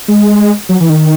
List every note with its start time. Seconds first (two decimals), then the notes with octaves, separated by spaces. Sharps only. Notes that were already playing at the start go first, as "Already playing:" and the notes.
0.08 G#3
0.69 F#3
0.81 E3
0.90 D#3